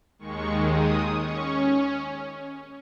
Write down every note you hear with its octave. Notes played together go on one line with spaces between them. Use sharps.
D#2 D#3 G#3 C#6
D#6
C#4 C#6